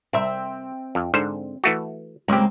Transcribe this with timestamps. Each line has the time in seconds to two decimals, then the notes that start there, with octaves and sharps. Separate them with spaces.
0.13 C2 C4 E5
0.95 F2
1.14 G#2 D3 C5
1.64 E3 A3 F#4
2.28 C#2 G#3 A#3 C4 G4